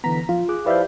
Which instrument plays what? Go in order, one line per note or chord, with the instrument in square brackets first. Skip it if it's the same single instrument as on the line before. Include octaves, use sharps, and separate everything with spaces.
[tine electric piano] D3 E3 B3 [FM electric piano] A#5 B6
[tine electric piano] F3 [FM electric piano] F4
[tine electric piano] G#4 D6 F#6
[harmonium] F3 E4 F5 [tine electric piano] G4 G6 [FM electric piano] B4 D5 E5